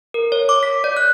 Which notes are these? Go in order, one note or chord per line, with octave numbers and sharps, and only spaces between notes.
A#4
C#5
D6
B6
D5
F#6